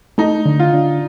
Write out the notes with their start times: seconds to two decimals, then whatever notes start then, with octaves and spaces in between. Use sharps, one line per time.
0.18 A3 D#4
0.46 D3
0.60 F4
0.74 D3